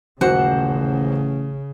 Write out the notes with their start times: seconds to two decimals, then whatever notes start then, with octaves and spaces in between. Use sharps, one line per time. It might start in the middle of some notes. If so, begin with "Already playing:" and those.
0.21 D#1 A1 C#3 F#4 C5 F#5